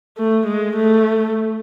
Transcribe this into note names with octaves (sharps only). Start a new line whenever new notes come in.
A3
G#3
A3